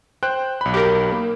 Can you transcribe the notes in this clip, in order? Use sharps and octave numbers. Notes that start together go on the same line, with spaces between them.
C5 G5 F#6
B1 B5
G4 A#4
A#3